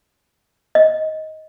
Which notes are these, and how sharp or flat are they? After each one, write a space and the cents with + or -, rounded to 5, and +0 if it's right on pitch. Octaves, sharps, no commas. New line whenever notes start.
D#5 +15